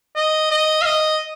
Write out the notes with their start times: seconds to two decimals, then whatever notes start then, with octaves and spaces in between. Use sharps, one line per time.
0.16 D#5
0.51 D#5
0.81 F5
0.85 D#5